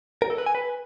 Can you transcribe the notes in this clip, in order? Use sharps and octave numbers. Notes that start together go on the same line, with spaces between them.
A#4
A4
B4
G#5
B4